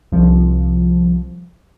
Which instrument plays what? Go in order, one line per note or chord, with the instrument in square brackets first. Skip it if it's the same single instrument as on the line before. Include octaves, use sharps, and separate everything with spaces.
[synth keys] C2 F3